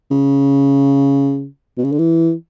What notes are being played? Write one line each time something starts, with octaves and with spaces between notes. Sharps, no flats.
C#3
B2
C#3
D3
E3